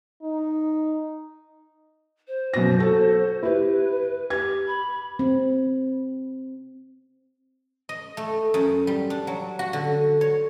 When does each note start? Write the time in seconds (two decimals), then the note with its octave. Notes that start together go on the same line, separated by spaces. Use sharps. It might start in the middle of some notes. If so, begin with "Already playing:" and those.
0.22 D#4
2.28 C5
2.54 F#2 B2 A#6
2.79 F#4 A4
3.43 E4 G4 B4
4.30 G4 G#6
4.67 B5
5.19 C4
7.89 D#5
8.17 A3
8.54 F#2
8.87 G3
9.10 D4
9.27 F#3
9.59 F#4
9.73 D3
10.21 C#5